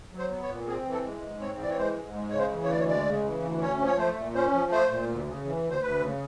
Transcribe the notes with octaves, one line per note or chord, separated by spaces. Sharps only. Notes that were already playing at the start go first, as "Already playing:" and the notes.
F#3
C5
B3
C#5
A#2
C4 G#4
E3
A4
G#3
G#2
C4 C#5
E3 D5
C#5
G#3 C5
G#2
G#3
C#3 C#5
C5
E3
C#5
D2 D5
C#5
G#3 D5
C#3
E3
D2
C#4 C#5
F3
C#5
A3 C5
A#2
C#4 C5
F3
A3 C5
A#2
D2
C#3
E3
D2
C5
D2 B4
C#3